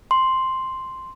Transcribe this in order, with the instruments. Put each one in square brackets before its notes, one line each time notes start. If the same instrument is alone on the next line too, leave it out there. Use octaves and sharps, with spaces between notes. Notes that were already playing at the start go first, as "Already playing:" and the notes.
[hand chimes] C6